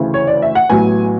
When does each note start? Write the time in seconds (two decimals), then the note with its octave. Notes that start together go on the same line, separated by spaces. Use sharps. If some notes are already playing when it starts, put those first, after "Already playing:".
Already playing: D2 C#3 E3 A3
0.14 C#5
0.27 D5
0.42 E5
0.55 F#5
0.69 A1 A2 F#3 B3 G#5